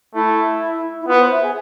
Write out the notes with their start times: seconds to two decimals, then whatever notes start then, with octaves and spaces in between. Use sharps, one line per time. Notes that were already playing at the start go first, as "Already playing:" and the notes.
0.14 A3 E4
1.01 E4
1.08 B3 F4
1.15 B4
1.19 C5
1.31 E5
1.43 G#4